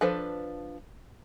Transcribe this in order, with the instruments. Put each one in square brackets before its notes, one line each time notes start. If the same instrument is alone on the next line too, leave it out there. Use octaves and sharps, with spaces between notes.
[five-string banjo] F3 D4 A4 B4 C5